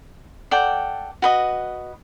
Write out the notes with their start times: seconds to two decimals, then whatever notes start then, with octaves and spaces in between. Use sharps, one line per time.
0.51 A4 D5 F#5 G5
1.22 F#4 B4 D#5